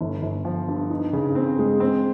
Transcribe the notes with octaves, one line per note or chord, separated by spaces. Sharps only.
G1
G1
F3
G2
D#4
C#3
C4
G#3
C4